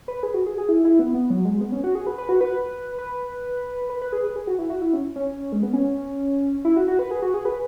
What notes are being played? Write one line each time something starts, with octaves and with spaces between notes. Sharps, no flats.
B4
G#4
F#4
G#4
G#4
E4
E4
B3
B3
F#3
G#3
B3
C#4
F#4
G#4
B4
B4
F#4
B4
B4
B4
B4
G#4
B4
G#4
F#4
E4
F#4
E4
C#4
C#4
G#3
B3
C#4
E4
F#4
F#4
B4
G#4
F#4
G#4
B4